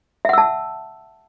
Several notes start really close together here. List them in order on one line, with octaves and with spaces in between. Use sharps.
E5 F#5 E6 A5